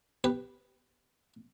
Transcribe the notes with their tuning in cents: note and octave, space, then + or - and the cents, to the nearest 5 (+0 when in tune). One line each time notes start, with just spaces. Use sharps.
G4 +0 B4 +0